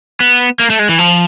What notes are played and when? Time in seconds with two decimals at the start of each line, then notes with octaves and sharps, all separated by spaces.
0.20 B3
0.59 A#3
0.70 A3
0.79 G#3
0.89 E3
0.99 F3